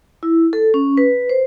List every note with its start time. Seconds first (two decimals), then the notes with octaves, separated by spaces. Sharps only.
0.23 E4
0.53 A4
0.74 C#4
0.97 B4
1.29 C5